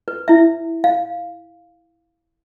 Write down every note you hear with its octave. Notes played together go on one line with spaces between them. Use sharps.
B4
E4 E5
F5